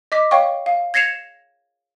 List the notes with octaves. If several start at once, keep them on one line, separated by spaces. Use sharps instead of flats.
D#5 D6 B6
C#5 F5 G5 C#6
F5
G#6 A#6 C7 C#7 E7 F7